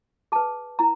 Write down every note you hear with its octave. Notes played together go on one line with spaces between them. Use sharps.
G#4 B4 A5
E4 A#5